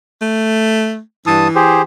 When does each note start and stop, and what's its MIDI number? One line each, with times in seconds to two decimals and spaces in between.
0.22 1.00 57
1.27 1.48 43
1.27 1.82 52
1.27 1.48 81
1.27 1.48 87
1.55 1.82 67
1.55 1.82 68
1.55 1.82 72